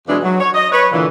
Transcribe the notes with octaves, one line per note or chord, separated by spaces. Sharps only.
F2 B2 E3 F#3 G#3 D4
F#3
C#5
D#5
B4 C#5
A#2 D3 E3